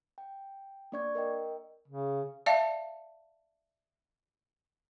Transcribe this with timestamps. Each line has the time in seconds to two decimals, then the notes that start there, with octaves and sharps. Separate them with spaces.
0.18 G5
0.92 A#3 D4 D5 C#6 G#6
1.15 A#4 D#5 G5
1.88 C#3
2.46 D5 E5 F5 A5